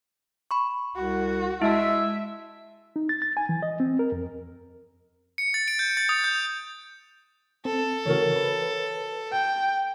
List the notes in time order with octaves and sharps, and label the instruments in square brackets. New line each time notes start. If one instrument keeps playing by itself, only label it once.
[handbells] B5 C#6
[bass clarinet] C2 [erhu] F#4
[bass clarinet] G#3 [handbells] E4 A5 [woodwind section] E5
[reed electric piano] D#4
A6
A6
G#5
E3
D#5
C4
A#4
F2
[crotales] C#7
A6
D7
G6
A6
D#6
G6
[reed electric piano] C4 [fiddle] A4
[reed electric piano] C#3 E3 [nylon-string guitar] F#4 A#4 C#5
[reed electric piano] B4
[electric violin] G5